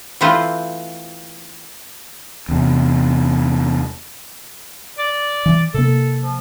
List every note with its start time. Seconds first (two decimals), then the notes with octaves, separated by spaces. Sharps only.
0.21 E3 A3 C4 F4 B4 C5
2.49 E2 C3
4.98 D5
5.46 E3
5.74 C3 A#3 A4
6.23 F3